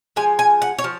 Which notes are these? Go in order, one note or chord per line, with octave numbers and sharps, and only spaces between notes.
F3 G#3 G#5
G#5
F#5
C#5
F3